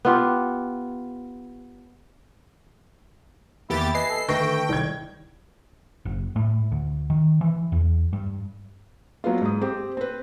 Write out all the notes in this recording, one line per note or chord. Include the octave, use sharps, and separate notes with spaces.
B3 F4 G4
E2 D#3 A#3 E4 G4 A6
B4 D#5 G#5 C7
A4
D3 D#3 A3 B4 G5 C#6 A#6
C2 D#3 E4 D5 G#6
F#1
A2
D2
D#3
E3
E2
G2
F#3 B3 F4
G#2 D#6
C4 G4
C4 B4